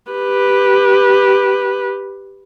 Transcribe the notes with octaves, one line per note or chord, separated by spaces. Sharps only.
G4 B4